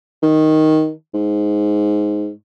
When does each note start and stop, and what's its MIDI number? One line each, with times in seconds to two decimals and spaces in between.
0.23 0.91 51
1.14 2.30 44